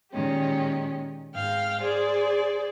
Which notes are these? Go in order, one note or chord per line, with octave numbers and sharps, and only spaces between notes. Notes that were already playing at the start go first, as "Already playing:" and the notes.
A#2 D#3 G#3 C#4 G4
G#2 F5 G5 F6
G#4 C5 D5